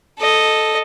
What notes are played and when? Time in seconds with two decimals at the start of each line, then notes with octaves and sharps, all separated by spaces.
0.19 A4 D#5